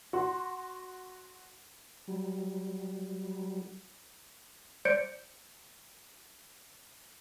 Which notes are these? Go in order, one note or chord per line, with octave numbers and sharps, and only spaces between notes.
F#4 C6
F#3 G3
C5 D5 G6 C#7 D7